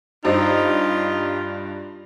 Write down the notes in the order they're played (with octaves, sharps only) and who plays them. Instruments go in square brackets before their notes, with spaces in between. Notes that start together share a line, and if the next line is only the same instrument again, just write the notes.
[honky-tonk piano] G2 [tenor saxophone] D#4 [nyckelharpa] F4 G4 [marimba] C5 D#5 E6